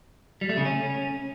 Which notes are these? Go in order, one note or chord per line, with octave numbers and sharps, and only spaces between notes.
G3
A3
C#3
C#4